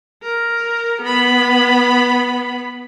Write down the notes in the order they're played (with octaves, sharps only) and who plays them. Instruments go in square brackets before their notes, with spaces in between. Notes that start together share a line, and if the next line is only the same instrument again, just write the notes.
[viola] A#4
B3 B5